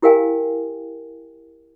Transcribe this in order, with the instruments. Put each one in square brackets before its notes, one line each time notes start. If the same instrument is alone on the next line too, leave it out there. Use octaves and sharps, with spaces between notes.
[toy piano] E4 G4 A#4 F5 G5 G#5